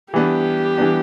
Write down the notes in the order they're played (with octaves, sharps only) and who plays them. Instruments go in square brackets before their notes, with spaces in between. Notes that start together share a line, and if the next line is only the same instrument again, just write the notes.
[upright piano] E3 G3 B3 D4 [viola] G4
[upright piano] E3 G3 B3 D4